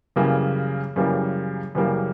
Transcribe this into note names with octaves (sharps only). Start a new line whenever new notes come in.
F#2 C#3 E3 G3 A#3
F#2 C#3 E3 G3 A#3
F#2 C#3 E3 G3 A#3